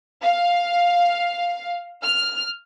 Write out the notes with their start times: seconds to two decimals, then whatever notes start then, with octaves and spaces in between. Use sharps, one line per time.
0.22 F5
2.04 F6